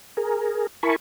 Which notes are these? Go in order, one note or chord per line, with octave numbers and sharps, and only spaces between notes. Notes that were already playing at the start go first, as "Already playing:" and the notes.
G#4 A#4
E4 A#4 G#5 A5 B5 C#6